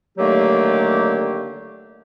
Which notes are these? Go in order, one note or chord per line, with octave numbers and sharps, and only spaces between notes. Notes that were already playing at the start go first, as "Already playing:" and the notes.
D3 D#3 F#3 A3 A#3 G4